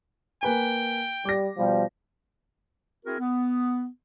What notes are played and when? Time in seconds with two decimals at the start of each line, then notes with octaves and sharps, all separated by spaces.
0.43 A#3 B4 G5 G#5
1.25 G3 D6 A#6
1.57 B2 F3 G3
3.05 C4 E4 F#4 G#4 A#4
3.19 B3